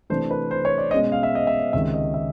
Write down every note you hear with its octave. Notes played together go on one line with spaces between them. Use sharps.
C3 E3 A3 D4 C5
B4
C5
C#5
D5
B2 G#3 C#4 D#5
F5
E5
D#5
E5
C#2 C3 D#3 G#3 C#4 E5
D#5
E5